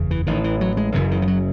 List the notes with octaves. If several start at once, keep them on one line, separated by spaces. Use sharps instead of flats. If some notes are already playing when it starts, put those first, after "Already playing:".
Already playing: F#1 E2 C#3
E3
A1 A2 D#3
E3
F#3
G#3
F#1 F#2 C#3 E3
E3
E3
F#3